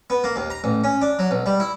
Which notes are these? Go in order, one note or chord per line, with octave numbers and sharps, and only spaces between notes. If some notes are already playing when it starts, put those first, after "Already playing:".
B3
A#3
D#2
A#5
A1
C#4
D4
F#3
B1
G3
E4